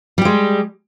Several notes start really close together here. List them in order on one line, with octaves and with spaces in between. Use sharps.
G3 G4 G#3